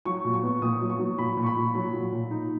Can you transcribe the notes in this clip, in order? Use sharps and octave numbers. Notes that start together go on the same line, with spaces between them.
F#3 C#6
A#2
C#6
B3
A#2 D#6
F#3
C#6
F#3
A#2 B5
A#2
C#6
B5
A#2
F#3
A#2
A#2
D#4